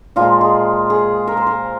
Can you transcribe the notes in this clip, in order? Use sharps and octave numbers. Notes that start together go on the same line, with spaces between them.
A#2 F3 G#3 F4
G#4
G#4
A#4
C5
A#4